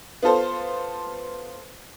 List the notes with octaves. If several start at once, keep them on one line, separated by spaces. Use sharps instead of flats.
B3 F4 A4 C5